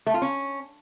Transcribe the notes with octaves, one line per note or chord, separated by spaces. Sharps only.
A3
F4
C#4